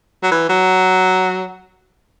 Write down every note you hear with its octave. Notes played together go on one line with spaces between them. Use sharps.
F#3
E3
F#3